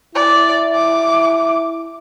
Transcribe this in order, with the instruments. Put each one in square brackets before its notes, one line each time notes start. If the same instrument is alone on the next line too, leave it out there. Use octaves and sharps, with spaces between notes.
[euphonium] E4 [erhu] D5
[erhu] D6